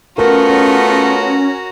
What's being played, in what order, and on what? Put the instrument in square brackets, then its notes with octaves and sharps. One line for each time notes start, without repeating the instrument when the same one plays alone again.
[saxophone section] A3 B3 F4 [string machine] C#4 [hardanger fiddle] F#4 A#5 [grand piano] A#4